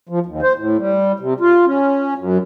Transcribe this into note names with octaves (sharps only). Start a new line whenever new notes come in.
F3
D#2
C5
A2
G3
C3
F4
C#4
F#2